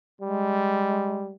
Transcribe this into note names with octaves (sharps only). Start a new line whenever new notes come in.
G3 G#3